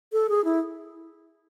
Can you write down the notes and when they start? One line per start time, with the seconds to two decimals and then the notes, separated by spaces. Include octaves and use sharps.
0.12 A4
0.29 G#4
0.44 E4